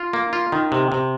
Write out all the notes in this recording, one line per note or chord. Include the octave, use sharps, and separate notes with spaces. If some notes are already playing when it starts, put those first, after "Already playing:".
Already playing: F4
A#3
F4
D#3
C3
C3